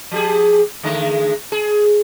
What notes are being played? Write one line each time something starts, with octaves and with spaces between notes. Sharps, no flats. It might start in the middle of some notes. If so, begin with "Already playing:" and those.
F3 G4 G#4
D3 G#3 A3
G#4